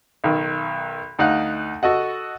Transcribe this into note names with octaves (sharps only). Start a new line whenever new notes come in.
B1 D#3
D2 D#4 F5 F#5 F#6
F#4 A4 D#5 F#5